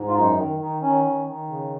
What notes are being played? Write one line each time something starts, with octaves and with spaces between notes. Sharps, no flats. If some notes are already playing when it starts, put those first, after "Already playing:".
Already playing: G#2
F4
F#2 D#4
D#3
D#3
D#3 C#4
D#3
D#3
C#3